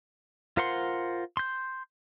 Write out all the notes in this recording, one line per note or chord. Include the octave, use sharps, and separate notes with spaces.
F4 A#4 C5 F#5 C6
C6 G6